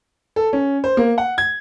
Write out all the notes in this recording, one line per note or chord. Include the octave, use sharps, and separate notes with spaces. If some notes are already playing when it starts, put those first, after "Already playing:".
A4
C#4
C5
A#3
F#5
G#6